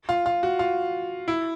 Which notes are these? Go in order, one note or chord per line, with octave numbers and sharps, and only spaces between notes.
F4
F4
F#4
F4
E4